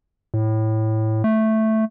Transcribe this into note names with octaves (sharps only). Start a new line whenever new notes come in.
A2
A3